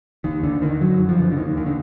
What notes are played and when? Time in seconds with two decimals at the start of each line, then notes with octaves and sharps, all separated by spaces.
0.24 D#2 D#3
0.43 D#2 D3
0.62 D3 D#3
0.80 F#2 F#3
0.99 F#2
1.09 F3
1.19 D3
1.32 D3
1.37 D#2 D#3
1.56 D#2 D#3
1.66 D3